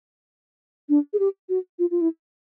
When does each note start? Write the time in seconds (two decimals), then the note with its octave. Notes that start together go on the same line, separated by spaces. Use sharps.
0.89 D4
1.13 G#4
1.19 G4
1.49 F#4
1.79 F4
1.91 F4
2.01 E4